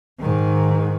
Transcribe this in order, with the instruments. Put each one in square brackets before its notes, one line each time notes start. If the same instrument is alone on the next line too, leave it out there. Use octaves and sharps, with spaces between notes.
[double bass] G#2 D#3